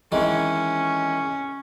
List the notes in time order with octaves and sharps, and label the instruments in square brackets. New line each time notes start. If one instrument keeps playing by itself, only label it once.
[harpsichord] D#3 E3 G#3 [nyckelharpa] C#4